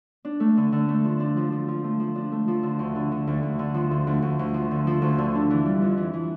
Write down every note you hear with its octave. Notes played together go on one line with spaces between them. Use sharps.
D4
A3
D3
D3
A3
F3
D4
F3
F3
F3
A3
F3
D4
A3
F3
D3
D2
D3
D3
D2
D2
D3
F3
D2
D2
D2
D2
F3
D3
F3
D2
D3
D4
E3
G3
F2
E3
E3